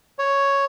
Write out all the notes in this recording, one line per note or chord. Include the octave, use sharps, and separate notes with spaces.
C#5